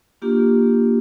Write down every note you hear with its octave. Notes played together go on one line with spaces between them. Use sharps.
A#3 D4 F4 G4